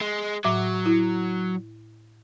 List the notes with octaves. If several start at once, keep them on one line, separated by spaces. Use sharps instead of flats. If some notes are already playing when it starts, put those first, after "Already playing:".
G#3
A2 F#3 E5 D6
E4